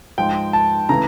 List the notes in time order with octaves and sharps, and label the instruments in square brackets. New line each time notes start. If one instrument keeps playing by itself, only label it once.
[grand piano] G#2 F3 G#3 G5
A5
C#3 E3 A3 A#5